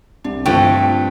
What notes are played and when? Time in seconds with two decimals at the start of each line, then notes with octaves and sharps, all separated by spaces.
0.24 C2 D4
0.46 G2 F3 A3 C4 G5 C#6